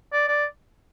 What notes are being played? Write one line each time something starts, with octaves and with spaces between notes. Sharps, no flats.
D5
D5